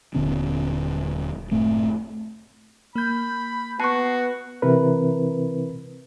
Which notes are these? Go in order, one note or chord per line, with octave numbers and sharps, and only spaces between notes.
D#1 D3 B3 C#4
F#1 A2 A3 C4
A#3 B5 G6
B3 F#4 A5 C#6 C7
C3 E3 C4 E4 A#4 B4